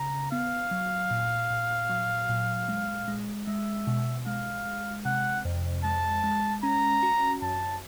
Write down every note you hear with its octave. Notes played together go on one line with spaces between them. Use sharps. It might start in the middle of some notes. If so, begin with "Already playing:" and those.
Already playing: C#3 A#5
B3 F5
F#3
A#2
A#2
F#3
A#2
G#3
G#3
G#3 E5
B2
G#3 F5
G#3
C3 F#5
F2
G#3 A5
G#3
C#4 A#5
F#4
F#2 A5